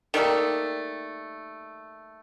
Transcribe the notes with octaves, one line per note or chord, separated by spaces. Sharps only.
D#3 G3 A3 A#3